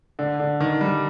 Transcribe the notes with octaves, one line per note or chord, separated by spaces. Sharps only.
D3
D3
D#3
G3